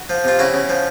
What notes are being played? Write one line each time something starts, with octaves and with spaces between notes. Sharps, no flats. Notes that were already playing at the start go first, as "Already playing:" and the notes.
Already playing: F#4
F3
C3 F4
C#3 E4 F#4
C#3
F3